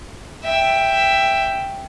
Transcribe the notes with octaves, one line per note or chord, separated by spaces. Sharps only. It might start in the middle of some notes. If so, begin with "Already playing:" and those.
E5 G5